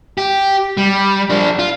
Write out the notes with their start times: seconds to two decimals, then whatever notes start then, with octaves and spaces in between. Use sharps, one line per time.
0.18 G4
0.77 G3
1.30 F3 D4
1.59 F4